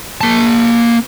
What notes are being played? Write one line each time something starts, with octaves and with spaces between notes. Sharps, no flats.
A#3 A5